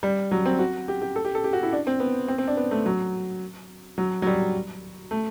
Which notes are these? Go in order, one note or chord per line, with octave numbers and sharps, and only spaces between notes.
G3
F#3
C4
F#4
G4
G4
A4
G4
A4
G4
F#4
E4
D4
C4
B3
C4
C4
D4
B3
A3
F#3
F#3
F#3
G3
A3